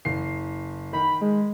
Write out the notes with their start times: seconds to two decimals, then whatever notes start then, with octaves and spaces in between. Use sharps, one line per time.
0.05 F#1 C7
0.93 D#3 B5
1.21 G#3